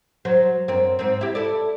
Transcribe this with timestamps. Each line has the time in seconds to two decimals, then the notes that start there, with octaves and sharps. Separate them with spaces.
0.25 F#3 C5
0.68 F#2 C4
0.99 G#2 C4
1.21 E4 G4
1.35 E4 A4 D5